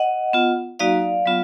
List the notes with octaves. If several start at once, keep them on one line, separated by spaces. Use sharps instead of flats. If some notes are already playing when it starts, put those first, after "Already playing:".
Already playing: D#5 F#5
B3 F4
F#3 A#3 D#4 F#4 D5 F5
F#3 B3 F4